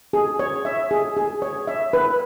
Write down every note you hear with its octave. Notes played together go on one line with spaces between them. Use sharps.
G#4
C#5
E5
G#4
G#4
C#5
E5
B4